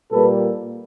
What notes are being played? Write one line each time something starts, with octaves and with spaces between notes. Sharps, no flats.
A#2 G3 A#3 A4 B4